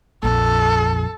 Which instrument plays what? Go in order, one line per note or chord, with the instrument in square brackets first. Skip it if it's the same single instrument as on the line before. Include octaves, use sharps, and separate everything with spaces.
[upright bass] A#1 F2 [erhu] A4